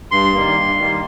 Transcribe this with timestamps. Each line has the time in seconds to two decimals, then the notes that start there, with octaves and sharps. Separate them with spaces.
0.11 G2 C6
0.34 D#3 G3 A#3
0.57 G2
0.78 D#3 G3 A#3